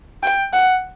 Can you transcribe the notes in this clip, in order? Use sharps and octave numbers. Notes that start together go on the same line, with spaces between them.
G5
F#5